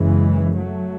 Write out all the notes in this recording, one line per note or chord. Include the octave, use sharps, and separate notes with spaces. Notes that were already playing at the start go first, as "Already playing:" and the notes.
Already playing: F#1 F#2 C#3 E3 G#3
F#3 A3